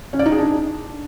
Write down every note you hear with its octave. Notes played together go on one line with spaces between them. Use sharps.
C#4
D5
D#4
G#4
D4